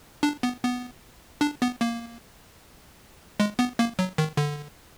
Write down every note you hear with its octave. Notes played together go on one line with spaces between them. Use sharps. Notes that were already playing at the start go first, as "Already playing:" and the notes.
D4
B3
B3
D4
B3
A#3
G#3
B3
A#3
F#3
D#3
D3